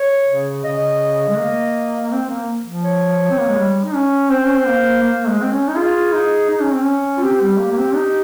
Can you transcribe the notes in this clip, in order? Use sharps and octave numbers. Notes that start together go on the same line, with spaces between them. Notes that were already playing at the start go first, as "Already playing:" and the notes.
Already playing: C#5
C#3
C#3 D#5
G#3
A#3
C4
A#3
F3
C#5
C4
A#3
G#3
G3
D#4
C#4
C4 C5
C#4
C4
A#3
A#3
G#3
C4
C#4
D#4
F4 G#4
D#4
D#4
C#4
C4
C#4
F4
C4 G4
G3
A#3
A#3
C4
D#4